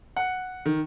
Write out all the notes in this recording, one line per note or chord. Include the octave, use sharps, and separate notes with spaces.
F#5
D#3